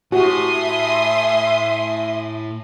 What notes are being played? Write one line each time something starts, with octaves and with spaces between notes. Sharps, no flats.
A2 F#4 G4 E5 G#5 C6 D#6